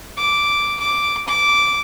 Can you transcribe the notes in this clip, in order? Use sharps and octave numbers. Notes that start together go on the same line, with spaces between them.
D6
D6
D6